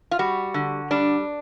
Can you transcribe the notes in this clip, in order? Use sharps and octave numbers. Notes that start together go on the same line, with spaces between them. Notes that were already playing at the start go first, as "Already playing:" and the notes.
F4
G3 F#4
D3
G3 D4